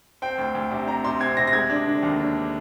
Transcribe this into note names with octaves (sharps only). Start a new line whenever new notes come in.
C4 G5
D2
D2
C3
C3 A#5
C3 C6
C4 G#6
C3 A#6
A#6
G#3 G#6
D4
D3
D#2
D4